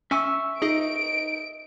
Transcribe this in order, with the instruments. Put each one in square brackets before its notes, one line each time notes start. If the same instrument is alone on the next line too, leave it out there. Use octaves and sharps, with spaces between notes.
[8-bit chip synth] C#4 G#5 [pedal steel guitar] E5 C#6 E6
[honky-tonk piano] D#4 [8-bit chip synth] G#4 D#5 [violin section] D7